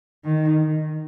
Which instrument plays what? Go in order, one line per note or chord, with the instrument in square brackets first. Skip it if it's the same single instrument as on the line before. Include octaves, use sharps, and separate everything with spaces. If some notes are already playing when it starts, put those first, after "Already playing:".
[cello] D#3